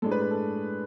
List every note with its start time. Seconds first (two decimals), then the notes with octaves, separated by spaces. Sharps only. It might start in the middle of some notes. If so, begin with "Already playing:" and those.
0.02 A2 G#3 D4 A4
0.11 B4
0.22 B4
0.31 A4